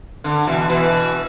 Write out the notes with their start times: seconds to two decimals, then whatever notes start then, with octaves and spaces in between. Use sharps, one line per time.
0.24 D3
0.47 B2 E3
0.69 B2 E3